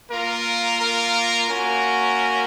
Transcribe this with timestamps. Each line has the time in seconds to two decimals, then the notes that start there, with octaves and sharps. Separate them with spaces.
0.10 A#3 F4 A#4
0.79 A#4
1.48 A#3 C#4 F#4 A#4